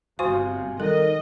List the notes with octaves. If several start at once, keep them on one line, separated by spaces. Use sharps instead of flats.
G1 C3 F#4 C5 F5 G#5 C6 C#6
D#3 G3 A4 D#5